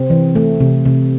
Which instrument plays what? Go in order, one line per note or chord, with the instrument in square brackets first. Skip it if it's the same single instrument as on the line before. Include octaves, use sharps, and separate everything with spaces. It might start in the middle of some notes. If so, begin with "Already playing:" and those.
Already playing: [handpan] C3 C4
E3
A3
C3
C3